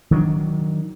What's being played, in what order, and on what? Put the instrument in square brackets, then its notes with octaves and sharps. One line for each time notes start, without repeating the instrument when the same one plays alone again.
[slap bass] D#3 F#3 G3 D4